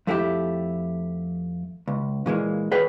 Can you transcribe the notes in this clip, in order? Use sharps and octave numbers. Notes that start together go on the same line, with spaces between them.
F2 A3 E4 G4
C#2
A#2 E3 G#3 A#3
G#4 B4 C#5 G5